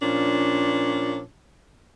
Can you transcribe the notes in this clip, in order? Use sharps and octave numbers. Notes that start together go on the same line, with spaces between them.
A#2 F3 C#4 D4